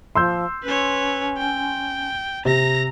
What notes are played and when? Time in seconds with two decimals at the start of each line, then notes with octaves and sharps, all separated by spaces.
0.15 F3 C6 E6 G6
0.64 C#4 B4 C#5
1.38 G5
2.45 C3 A#5 A#6